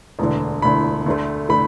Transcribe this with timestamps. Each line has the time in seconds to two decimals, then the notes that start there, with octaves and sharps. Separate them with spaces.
0.19 E1 D2 D3
0.62 E1 D2 D3 B5
1.06 D2 D3 A3
1.49 D3 A3 B5